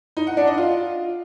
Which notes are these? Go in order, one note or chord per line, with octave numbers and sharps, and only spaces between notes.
D#4
F#5
D4
D#5
F4